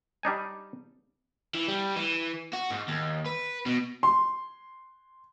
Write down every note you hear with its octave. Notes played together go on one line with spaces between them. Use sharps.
G3 D4 D#4 G#5
E3
G3
E3
F#4
G#2
D#2
B4
B2
C6